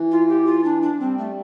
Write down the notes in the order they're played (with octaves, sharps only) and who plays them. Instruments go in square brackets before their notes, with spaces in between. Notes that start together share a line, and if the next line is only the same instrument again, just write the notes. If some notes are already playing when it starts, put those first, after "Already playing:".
Already playing: [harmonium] E3
[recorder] F4
G4
F4
D4
D4
[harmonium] G3 [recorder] C4
[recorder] A3